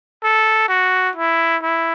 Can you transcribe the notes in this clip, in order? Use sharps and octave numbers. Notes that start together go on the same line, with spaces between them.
A4
F#4
E4
E4